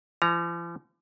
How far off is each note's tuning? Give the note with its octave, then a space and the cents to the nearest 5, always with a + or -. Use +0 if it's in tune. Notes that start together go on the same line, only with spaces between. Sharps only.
F3 -45 A#5 +0